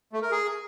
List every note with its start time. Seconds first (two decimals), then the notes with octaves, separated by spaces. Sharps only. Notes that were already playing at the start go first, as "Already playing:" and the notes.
0.13 A3
0.22 A#4
0.32 G#4